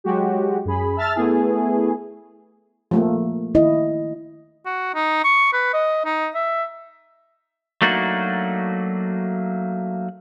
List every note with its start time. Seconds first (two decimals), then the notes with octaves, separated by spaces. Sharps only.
0.04 F#3 G#3 F#4 G4
0.65 F#2 G#4 B5
0.97 E5 A5 E6 F6 A6
1.15 A3 B3 E4 G#4
2.91 F3 A3 A#3
3.55 D#3 E4 D#5
4.66 F#4
4.95 D#4
5.24 C#6
5.53 B4
5.74 D#5
6.05 D#4
6.35 E5
7.82 F#3 A3 A#3 D4 D#4 F#4